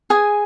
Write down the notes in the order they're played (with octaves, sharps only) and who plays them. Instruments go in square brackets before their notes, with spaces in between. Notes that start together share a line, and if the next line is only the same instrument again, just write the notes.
[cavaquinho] G#4 G#5